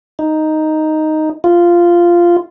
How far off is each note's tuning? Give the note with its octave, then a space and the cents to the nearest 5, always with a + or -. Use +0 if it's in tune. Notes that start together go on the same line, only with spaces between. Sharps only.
D#4 +0
F4 -10